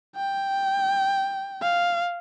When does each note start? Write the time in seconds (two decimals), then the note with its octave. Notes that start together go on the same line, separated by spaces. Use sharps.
0.16 G5
1.62 F5